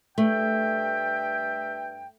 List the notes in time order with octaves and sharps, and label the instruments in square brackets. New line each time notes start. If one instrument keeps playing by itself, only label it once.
[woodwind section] G2 E5 G5 [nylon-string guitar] A3